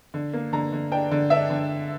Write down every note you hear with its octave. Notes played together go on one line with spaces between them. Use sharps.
D3
A#3
D3 A#5
D3
D4 G5
D3
D4 E5
D3